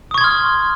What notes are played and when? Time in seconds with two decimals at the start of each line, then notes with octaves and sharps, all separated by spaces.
0.11 D#6
0.14 C#6
0.18 G#6
0.21 C6
0.24 F6